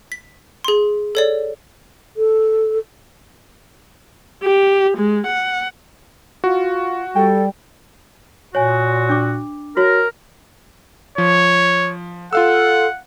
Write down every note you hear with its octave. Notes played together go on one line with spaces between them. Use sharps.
B6
G#4 C6
A4 C#5 D5
A4
G4
G#3
F#5
F4 F#4
G3 A4 G5
A#2 F#4 C#5 G#5
D4 D6
F#4 A#4 C#5
F3 C#5
F4 A4 F5 F#5 E6